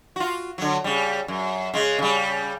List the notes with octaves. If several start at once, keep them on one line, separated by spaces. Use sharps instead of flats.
F4 F#4
D3 F#3
C#3 G3
F#2
C#3 G#3
C#3 G3